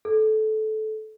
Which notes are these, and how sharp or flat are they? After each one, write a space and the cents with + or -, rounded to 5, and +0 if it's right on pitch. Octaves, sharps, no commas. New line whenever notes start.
A4 -20